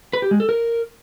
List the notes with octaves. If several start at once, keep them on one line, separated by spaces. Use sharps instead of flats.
B4
G4
G#3
A4
A#4